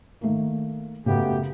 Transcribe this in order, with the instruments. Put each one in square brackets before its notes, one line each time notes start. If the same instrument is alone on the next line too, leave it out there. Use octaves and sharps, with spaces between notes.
[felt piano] D#3 A3 A#3
[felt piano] F#2 C#3 [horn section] A3 B3 G4